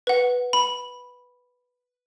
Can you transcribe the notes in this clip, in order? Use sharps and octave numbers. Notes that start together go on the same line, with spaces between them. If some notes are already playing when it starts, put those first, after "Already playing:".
B4 F#5
B5